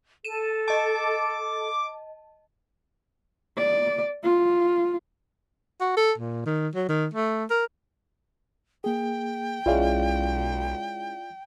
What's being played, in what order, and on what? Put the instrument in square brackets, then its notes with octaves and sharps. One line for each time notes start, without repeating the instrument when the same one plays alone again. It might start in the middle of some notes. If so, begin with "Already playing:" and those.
[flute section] A4 [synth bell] D#7 E7
[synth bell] D#5 A5 [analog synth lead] D6
[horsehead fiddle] D5
F4
[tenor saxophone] F#4
A4
A#2
D#3
F#3
D#3
A3
A#4
[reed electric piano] A#3 G#4 [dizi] G5
[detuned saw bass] B1 [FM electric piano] G#3 C#4 E4 [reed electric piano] F4 D5 F5